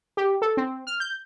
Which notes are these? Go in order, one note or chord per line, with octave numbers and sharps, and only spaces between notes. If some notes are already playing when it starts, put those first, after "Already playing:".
G4
A4
C4
F6
G6